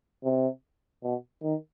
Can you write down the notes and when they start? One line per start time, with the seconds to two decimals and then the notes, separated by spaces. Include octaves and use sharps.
0.24 C3
1.03 B2
1.43 D#3